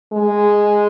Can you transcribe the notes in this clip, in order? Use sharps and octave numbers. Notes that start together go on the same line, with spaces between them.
G#3